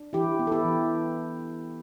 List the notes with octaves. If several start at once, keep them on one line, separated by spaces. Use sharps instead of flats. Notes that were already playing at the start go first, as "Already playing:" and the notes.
Already playing: D4
E3 E4 G4
B3
A4
E4 G4
E3